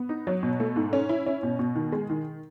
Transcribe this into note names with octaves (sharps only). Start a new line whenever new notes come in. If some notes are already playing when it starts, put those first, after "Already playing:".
Already playing: B3
D#4
F#3
B2
A3
G#2
C#4
E4
C#4
B2
B2
D#3
G#3
D#3